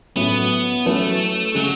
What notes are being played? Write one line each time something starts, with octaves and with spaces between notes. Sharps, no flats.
A2 F#3 B3 C#4 E4
F#3 A3 C#4 E4 B4
C#3 F#3 G#3